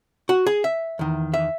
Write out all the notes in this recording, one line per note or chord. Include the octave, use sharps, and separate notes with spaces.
F#4
G#4
E5
E2 D#3
E5